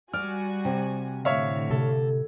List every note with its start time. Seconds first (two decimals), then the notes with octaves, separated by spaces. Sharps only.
0.13 G3 F#4 D5 G#5 F6
0.65 C3
1.25 A2 D3 C#5 E5 F5
1.71 C3 A4